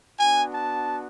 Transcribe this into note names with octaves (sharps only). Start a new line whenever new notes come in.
B3 D4 F#4 G#5
A5